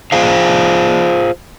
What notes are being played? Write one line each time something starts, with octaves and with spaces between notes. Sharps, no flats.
F4 G#4 C5 F5